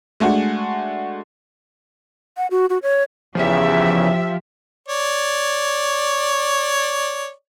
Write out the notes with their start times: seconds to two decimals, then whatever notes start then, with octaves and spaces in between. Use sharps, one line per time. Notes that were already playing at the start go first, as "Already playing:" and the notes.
0.20 G#3 A3 D4 F#4
2.37 F#5
2.51 F#4
2.70 F#4
2.83 C#5
3.35 E2 C#3 F3 G4 E5
4.88 C#5 D5